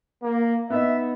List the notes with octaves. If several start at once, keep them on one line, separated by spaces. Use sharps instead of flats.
A#3
B3 D#4 E5